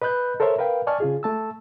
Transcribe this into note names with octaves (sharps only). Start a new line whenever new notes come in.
B4 D#5 B5 F#6 G6
A4 A#4 C5 C#5 E5
A#4 B4 F5 G5
D5 D#5 G#5 A5 C#6 F6
C#3 F4 G#4
A3 A5 E6